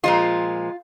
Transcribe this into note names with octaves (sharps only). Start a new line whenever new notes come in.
A#2 F3 G#3 F4